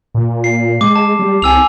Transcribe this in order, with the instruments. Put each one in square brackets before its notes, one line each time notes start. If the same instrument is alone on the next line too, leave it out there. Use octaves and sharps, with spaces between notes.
[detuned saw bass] A#2
[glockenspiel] C7
[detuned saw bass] G#3 [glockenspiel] D6
[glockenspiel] A5
[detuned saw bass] G3
[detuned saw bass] C2 [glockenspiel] G#5 E6 F7